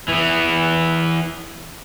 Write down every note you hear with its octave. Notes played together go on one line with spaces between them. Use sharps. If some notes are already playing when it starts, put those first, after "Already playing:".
E3 B3